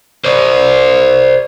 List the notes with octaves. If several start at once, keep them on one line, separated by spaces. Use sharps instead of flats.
C5 D5